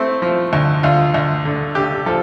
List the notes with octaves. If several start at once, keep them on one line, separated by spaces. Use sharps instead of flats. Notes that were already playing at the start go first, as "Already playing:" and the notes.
Already playing: A3 C4 E4
F3
D2
D2 F4
D2
D3
D3 G4
F3 A4